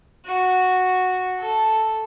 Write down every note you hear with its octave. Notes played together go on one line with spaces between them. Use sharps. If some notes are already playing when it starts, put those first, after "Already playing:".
F#4
A4